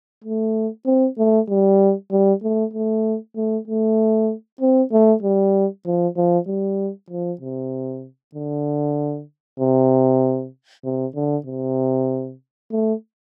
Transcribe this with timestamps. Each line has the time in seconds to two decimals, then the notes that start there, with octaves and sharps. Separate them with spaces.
0.24 A3
0.86 C4
1.18 A3
1.49 G3
2.11 G3
2.43 A3
2.73 A3
3.36 A3
3.68 A3
4.61 C4
4.92 A3
5.23 G3
5.86 F3
6.17 F3
6.47 G3
7.10 F3
7.41 C3
8.35 D3
9.60 C3
10.84 C3
11.15 D3
11.46 C3
12.71 A3